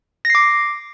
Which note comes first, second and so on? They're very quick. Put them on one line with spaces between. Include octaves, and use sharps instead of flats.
A#6 C7 D6